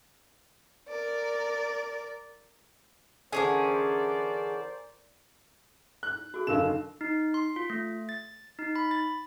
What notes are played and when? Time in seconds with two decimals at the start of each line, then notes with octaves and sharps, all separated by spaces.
0.89 A#4 D5
3.33 D3 E3 C#4 G#4 A#4 C5 D5
6.03 F#6
6.34 F#4 G#4
6.47 F#1 D3 D#4 A#4 F5 E7
6.59 D#4
7.01 D#4
7.34 C6
7.56 F4
7.70 A3
8.09 A6
8.59 D#4
8.76 B5
8.91 A6